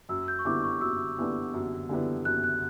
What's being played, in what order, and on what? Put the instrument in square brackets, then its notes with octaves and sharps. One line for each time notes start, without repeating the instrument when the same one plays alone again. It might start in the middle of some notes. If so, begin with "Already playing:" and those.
[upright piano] F#2 [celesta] E6
[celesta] G6
C#6
[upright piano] D3 G3 B3 E4 [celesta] D6
[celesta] C#6
[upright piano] F#2 [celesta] E6
[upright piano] D3 G3 B3 E4
F#2
D3 G3 B3 E4
[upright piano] F#2 [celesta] F#6
[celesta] F#6